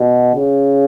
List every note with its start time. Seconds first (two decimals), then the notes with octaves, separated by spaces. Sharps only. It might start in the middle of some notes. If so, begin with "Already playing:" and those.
Already playing: B2
0.35 C#3